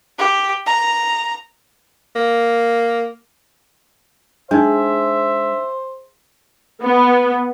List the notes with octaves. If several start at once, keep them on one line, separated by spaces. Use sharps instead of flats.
G4
A#5
A#3
G#3 D4 D#4 C5 E5
B3